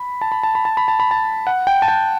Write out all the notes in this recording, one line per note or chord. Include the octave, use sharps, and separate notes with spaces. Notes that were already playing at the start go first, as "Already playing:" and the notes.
Already playing: B5
A5
B5
A5
B5
A5
B5
A5
B5
A5
F#5
G5
A5
G5